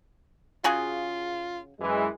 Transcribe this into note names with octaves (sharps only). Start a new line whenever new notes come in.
C#3 F4 F#4 G#4
F#2 E3 G#3